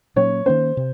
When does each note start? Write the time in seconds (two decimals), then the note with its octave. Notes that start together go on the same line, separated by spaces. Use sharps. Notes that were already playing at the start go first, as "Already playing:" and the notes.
0.16 A#2 F#3 A#3 C#4 C#5
0.46 D#3 A#3 C#4 C5
0.77 C3